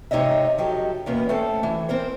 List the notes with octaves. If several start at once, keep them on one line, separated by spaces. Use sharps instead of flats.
G#2 C3 D#4 C#5 D#5 E5
F3 F#3 G4 A4
E2 B2 A#3 B3 C#4
A3 C4 C#4 A4 A5
E3
C4 A#4 C5